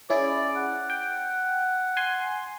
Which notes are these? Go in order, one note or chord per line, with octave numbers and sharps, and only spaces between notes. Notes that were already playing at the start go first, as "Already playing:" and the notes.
C#4 E4 G#4 D5
F#5
G5
G#5 C6